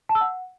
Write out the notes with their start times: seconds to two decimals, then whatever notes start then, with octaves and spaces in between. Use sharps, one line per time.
0.09 A5
0.15 E6
0.21 F#5